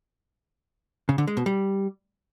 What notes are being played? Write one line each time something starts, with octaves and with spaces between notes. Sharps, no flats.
C#3
D3
G#3
B2
G3